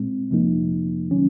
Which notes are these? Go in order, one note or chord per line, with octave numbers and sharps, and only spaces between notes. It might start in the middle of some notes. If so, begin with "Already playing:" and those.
Already playing: A#2 G#3 C4
F2 C3 F3 A#3 D#4
D#3 F#3 C#4